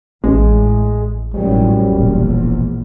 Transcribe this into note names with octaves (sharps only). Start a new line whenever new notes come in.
A1 A2 G#3
G#1 F#2 A2 C3 F#3 G3
E1 A#1 E2